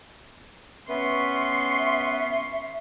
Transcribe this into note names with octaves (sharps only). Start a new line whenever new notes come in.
B3 C#4 B4 E5 C6 C#6